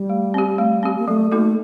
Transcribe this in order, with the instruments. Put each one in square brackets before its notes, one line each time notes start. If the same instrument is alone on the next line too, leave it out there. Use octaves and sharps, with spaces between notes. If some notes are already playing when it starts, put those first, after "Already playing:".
Already playing: [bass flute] G3
[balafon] A3
C4 G4
A3
C4 G4
[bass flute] A#3
[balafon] F#3 [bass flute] A3
[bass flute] A3 [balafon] A#3 D#4 F#4 A4